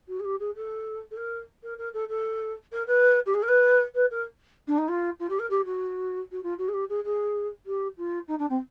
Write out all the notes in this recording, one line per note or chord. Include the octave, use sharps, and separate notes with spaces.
F#4
G#4
G4
G#4
A4
A4
A#4
A#4
A#4
A4
A4
A#4
B4
G4
G#4
A#4
B4
B4
A#4
D4
D#4
F4
F4
G4
A#4
G4
F#4
F#4
F4
F#4
G#4
G4
G#4
G#4
G4
F4
D#4
D4
C4